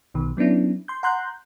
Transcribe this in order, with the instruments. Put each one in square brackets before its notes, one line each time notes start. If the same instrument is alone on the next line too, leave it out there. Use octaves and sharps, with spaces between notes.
[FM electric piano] B1 B2 D#3
F#3 B3 C#4 D4 E4
C6 G6
F#5 A#5 C6 F#6 G6